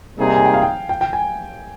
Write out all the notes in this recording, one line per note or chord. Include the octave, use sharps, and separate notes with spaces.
C3 G3 A#3 D#4 G#4
G#5
G5
F5
G5
G5
G5
G#5